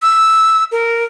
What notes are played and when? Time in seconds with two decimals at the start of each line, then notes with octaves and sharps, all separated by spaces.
0.02 E6
0.72 A#4